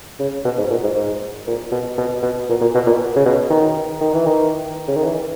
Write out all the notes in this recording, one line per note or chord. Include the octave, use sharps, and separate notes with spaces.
C#3
B2
G#2
A#2
G#2
G#2
A#2
B2
B2
B2
A#2
A#2
B2
A#2
C#3
B2
D#3
D#3
E3
D#3
C#3
D#3
E3